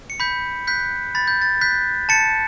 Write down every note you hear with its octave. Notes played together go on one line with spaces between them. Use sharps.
C#7
B5 G6 B6
F#6 G6 B6
B5 A6
G6
A6
F#6 G6 B6
A5 A6 C#7